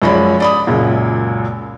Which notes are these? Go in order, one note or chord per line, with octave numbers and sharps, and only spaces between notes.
F#2 F3 G#3 C#5 D5 B5
D5 B5 D#6
C#2 F#2 A#2